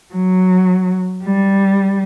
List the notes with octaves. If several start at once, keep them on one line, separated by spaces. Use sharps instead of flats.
F#3
G3